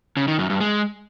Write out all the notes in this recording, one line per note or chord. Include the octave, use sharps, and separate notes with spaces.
C#3
D#3
F#2
G2
G#3